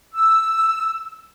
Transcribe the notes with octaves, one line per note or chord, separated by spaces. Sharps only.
E6